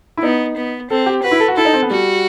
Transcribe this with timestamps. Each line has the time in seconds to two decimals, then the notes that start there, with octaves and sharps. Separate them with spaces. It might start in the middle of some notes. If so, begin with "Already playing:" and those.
0.17 E4
0.23 B3 D#4
0.57 B3
0.90 C4 A4
1.06 G4
1.23 F#4 B4
1.31 E4
1.40 A4
1.48 F#4
1.57 E4 A4
1.65 D#4
1.73 C4
1.82 B3
1.90 G3 F#4